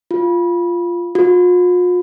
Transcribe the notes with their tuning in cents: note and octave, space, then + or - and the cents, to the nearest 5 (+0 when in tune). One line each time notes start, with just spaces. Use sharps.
F4 -5
F4 +45